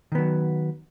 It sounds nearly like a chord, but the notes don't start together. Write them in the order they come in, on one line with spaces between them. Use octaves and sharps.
D#3 B3 F#3